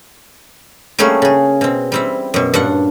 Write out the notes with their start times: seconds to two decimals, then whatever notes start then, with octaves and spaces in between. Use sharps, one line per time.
0.98 G3 A3 A#3 C#4 G#4
1.22 C#3 G#4
1.61 B2 C4
1.92 G3 C4 E4
2.34 F#2 B2
2.54 G2 A#2 D4 F#5